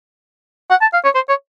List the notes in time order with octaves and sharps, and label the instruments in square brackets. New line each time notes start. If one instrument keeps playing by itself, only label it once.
[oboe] F#5
A5
F5
C#5
C5
C#5